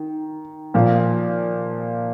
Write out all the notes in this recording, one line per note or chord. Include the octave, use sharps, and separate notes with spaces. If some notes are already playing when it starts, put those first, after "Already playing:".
Already playing: D#3
A#2 F3 A#3